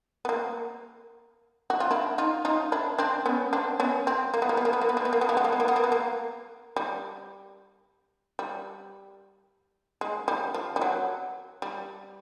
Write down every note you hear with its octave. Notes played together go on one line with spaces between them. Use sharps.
B3
A#3
F#4
F4
D4 E4
D#4 F4
D#4 F4
D4 E4
C4 D4
B3 C#4
C4 D4
B3 C#4
C4
A#3
B3
A#3
B3
A#3
B3
A#3
B3
A#3
B3
A#3
B3
A#3
B3
A#3
B3
A#3
B3
A#3
B3
A#3
G3
G3
G#3
G3
F3
G3
F#3
G3